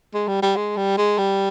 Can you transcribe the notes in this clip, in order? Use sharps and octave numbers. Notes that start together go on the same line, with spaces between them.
G#3
G3
G3
G#3
G3
G#3
G3